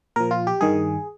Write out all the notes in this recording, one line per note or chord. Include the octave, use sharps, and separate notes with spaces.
A#2 F3 A#4
F4
G4
G2 D#3 G#4